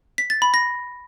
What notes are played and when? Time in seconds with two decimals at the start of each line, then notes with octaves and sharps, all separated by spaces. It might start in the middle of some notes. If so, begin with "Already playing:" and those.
0.18 B6
0.30 A6
0.42 B5
0.54 A#6